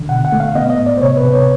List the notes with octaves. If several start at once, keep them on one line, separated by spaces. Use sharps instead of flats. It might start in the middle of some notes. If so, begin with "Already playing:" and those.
Already playing: D3
B2 F#5
F#5
A3
F5
B3 D#5
D#5
A2
D5
C5
C3 C#5
B4
C3
C#5